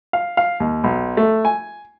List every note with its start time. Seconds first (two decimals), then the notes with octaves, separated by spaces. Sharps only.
0.13 F5
0.37 F5
0.60 D#2
0.84 B1
1.17 A3
1.45 G#5